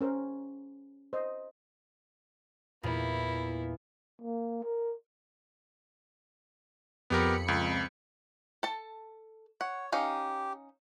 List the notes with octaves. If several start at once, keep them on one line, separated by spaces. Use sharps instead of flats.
C#4 A#4 C5
C5 D#5
E2 A#2 A#3 E4
A#3
A#4
F2 B3 G4 A#4 B5 C#7
C#2
A4 A5
C#5 F#5
C#4 D#4 G4 F5